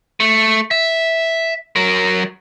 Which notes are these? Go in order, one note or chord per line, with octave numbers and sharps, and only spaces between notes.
A3
E5
F#3 A#4